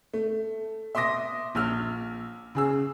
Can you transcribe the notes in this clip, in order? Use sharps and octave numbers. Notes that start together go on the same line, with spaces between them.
A3
E5 C6 D6 D#6 A#6
A#1 E6 F6
C#3 G#4 E6